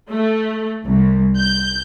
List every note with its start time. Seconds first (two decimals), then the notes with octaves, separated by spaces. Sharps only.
0.10 A3
0.86 C2
1.38 G6